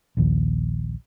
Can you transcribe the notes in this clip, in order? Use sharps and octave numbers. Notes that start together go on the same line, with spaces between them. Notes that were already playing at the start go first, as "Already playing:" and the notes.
A#1 D#2